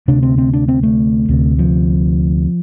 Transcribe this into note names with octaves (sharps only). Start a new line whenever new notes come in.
D2 C3 D4
C4
C4
D4
C4
A3
D2 C3
F3